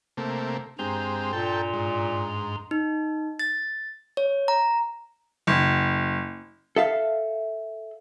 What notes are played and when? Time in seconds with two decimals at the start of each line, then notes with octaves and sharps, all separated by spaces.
0.17 C3 A3 A#3
0.79 G2 G#3 C4 G4 A#5 C6
1.33 A#2 A4 G5
1.73 G#2
2.71 D#4
3.39 A6
4.17 C#5
4.48 A#5
5.47 F#1
6.76 A4 E5 F5